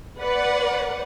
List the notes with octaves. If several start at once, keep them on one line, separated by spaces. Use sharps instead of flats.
B4 D5 F#5